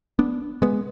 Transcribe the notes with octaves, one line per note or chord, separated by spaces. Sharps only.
B3 D4
G#3 B3